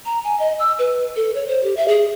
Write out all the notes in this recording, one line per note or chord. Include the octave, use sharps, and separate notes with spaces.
A#5
G#5
D#5
E6
B4
A4
C#5
C5
G4
E5
G#4